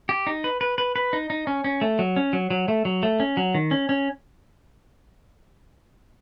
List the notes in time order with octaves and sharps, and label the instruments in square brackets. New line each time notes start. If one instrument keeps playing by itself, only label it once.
[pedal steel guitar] G4
D#4
B4
B4
B4
B4
D#4
D#4
C#4
C#4
A3
F#3
C#4
F#3
F#3
A3
F#3
A3
C#4
F#3
D#3
C#4
C#4